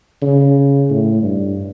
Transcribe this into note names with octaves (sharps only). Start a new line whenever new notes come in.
C#3
A2
G2